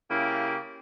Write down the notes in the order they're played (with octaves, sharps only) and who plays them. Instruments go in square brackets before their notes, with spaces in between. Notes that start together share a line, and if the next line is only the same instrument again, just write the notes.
[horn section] C#3 A#3 E4 G4